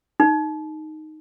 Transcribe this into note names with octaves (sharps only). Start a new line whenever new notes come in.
D#4